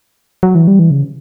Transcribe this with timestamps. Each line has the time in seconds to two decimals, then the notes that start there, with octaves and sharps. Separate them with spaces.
0.43 F#3
0.55 E3
0.68 G3
0.79 E3
0.91 C#3